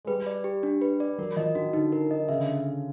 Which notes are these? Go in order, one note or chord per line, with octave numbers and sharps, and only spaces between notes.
G#3
G3 B4
D5
G4
D4
B4
D5
F#3 A#4
F3 D#5
D#3 F#4
D3 D#4
A#4
D#5
C#3 E5
D3